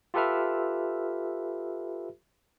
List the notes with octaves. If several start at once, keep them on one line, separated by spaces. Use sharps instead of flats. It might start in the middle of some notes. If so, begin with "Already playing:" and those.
F4 G4 A4 B4 E5 F6